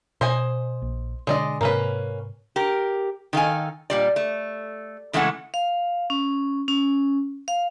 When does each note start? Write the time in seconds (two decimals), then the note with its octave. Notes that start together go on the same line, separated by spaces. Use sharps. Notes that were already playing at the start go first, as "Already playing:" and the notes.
0.21 B2 C5 D#5 G#5
0.82 A#1
1.27 B2 D3 G#3 D4 D5 D#5
1.61 G#2 C3 A#3 C#4 B4
2.56 G4 A#4
3.33 D#3 A4 F5 G#5
3.90 A#2 G3 D5
4.16 A3
5.13 C#3 E3 G#3 A3 A4 F#5
5.54 F5
6.10 C#4
6.68 C#4
7.48 F5